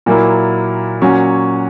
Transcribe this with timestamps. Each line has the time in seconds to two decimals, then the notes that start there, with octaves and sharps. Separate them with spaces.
0.06 A#2 F#3 A#3 E4
1.01 A#2 F#3 C#4 F#4